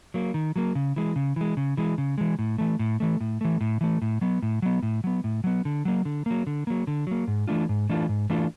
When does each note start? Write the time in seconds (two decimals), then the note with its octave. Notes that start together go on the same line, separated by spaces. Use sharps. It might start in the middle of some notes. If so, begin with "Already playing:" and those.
0.14 F#3 A#3
0.34 D#3
0.56 F#3 A#3
0.75 C#3
0.96 E3 G#3
1.16 C#3
1.36 E3 G#3
1.57 C#3
1.77 E3 G#3
1.98 C#3
2.18 E3 G#3
2.39 A2
2.58 E3 A3
2.79 A2
3.00 E3 A3
3.21 A2
3.41 E3 A3
3.61 A2
3.81 E3 A3
4.02 A2
4.21 F#3 B3
4.42 A2
4.62 F#3 B3
4.83 A2
5.04 F#3 B3
5.24 A2
5.44 F#3 B3
5.65 D3
5.85 F#3 A#3
6.05 D3
6.26 F#3 A#3
6.47 D3
6.67 F#3 A#3
6.87 D3
7.07 F#3 A#3
7.28 G#2
7.48 E3 A3 D4 F4
7.69 G#2
7.89 E3 A3 D4 F4
8.09 G#2
8.30 E3 A3 D4 F4